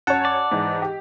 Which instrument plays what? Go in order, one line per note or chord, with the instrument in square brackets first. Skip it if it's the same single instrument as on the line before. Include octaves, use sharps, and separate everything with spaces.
[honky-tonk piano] F#2 C#5 [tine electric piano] F#5 A5
[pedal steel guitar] D5
[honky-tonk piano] G#2 E3
G4